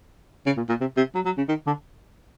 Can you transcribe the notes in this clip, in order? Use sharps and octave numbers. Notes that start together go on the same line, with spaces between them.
C#3
A#2
A#2
C3
C3
F#3
F#3
C#3
D#3
D3